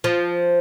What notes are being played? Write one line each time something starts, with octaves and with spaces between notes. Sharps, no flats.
F3